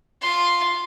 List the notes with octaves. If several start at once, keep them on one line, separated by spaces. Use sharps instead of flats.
F4 C6